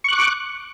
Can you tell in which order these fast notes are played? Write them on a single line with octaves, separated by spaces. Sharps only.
C#6 F#6 D6